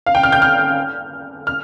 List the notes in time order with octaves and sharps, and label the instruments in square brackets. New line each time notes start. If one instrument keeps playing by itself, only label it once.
[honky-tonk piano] F5
G5
F6
G6
F6
F6